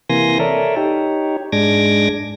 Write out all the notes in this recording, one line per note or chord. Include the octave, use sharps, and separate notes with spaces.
C3 E3 A#3 G#5 C6 A#6
A4 A#4 C#5 D5 E5
D#4 G4 C#5
G#2 G#3 D4 D6 G#6 A#6